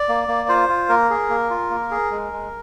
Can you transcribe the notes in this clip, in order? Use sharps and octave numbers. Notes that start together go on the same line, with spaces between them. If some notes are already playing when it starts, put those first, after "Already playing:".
Already playing: D5
A#3
A#3
F4 C5
F4
A#3 A#4
G#4
A#3
F4
A#3
G#4
G#3
G#3